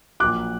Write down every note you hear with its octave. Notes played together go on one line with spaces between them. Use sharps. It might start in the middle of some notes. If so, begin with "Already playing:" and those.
A#1 A#2 F#3 D6 F#6